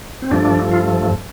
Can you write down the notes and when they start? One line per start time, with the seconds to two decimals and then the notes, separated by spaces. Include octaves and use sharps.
0.22 C4
0.31 G2 F3 A3 D4
0.71 F4